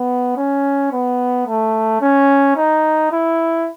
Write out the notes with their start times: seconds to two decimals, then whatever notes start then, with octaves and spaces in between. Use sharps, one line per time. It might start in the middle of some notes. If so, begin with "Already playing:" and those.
Already playing: B3
0.37 C#4
0.92 B3
1.47 A3
2.01 C#4
2.56 D#4
3.11 E4